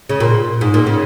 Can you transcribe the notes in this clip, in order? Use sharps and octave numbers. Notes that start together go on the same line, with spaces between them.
C#3
A#2
G#2
A#2
C#3